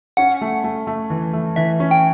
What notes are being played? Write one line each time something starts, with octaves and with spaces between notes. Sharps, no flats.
C#4 F#5
A3
A3
A3
E3
A3
E3 E5
C#4
G5